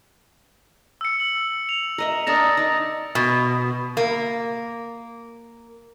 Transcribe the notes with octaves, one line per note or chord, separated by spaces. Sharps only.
E6 C#7
F#7
F7
A#4 D#5 E5
D4 A#4 E5 D#6 A6 A#6
D#4 A#4
B2
A#3